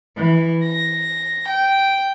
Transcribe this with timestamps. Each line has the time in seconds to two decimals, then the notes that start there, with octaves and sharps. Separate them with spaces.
0.17 E3
0.62 A#6
1.48 G5